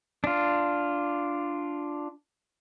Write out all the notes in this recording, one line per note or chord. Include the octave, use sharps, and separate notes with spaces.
D4 F4